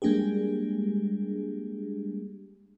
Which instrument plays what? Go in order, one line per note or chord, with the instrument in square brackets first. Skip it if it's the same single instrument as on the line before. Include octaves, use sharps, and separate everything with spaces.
[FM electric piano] G3 G#3 A#3 D4 G4 G#4